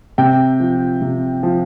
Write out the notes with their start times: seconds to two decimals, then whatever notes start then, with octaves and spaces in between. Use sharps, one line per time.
0.18 C3 G5
0.60 F3
1.02 C3
1.43 F3